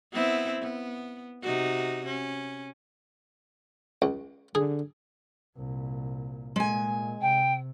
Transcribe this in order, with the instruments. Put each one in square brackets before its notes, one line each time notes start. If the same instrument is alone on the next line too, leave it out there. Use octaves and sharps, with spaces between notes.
[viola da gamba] B3 C4 E4
B3
C3 D#4 F#4
C#4
[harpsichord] C#2
[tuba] D3 [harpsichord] G#4
[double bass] C2 A#2
[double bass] A#2 [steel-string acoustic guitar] G#3 G#5
[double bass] C3 [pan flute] G5